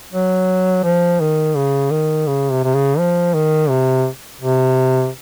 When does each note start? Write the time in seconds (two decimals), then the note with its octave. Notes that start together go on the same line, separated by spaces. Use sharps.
0.13 F#3
0.84 F3
1.20 D#3
1.56 C#3
1.91 D#3
2.27 C#3
2.50 C3
2.64 C3
2.75 C#3
2.98 F3
3.34 D#3
3.69 C3
4.41 C3